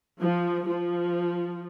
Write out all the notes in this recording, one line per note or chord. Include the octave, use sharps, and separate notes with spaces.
F3
F3